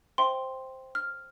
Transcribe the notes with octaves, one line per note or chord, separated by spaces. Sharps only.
C5 E5 G5 C6
F6